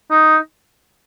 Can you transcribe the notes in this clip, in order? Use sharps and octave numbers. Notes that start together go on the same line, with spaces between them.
D#4